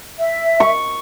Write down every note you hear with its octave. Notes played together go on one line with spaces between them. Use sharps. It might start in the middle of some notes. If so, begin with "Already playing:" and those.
E5
C#6